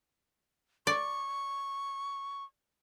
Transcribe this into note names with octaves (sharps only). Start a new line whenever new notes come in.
D5 C#6